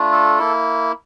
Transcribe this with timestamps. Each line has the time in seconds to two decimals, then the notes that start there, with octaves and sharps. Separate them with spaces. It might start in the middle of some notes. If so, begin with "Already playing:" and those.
Already playing: A3 D4 F4
0.13 A4
0.39 A#3 E4